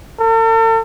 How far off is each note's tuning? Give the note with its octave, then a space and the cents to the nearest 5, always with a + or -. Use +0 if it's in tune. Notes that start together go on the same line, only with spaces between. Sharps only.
A4 +45